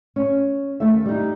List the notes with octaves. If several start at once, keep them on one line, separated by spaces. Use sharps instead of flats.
C#4
D#2 A3 A4 E5
G3 D#4